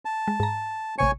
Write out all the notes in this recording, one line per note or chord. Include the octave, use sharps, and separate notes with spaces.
A5
G#3
G#2 A#5
A1 C3 C#5 G#5 C#7